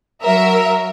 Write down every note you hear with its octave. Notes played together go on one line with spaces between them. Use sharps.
F#3 A#4 E5